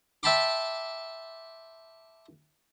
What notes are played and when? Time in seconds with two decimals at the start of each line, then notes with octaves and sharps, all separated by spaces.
0.23 E5 G5 A5 B5 C6 D6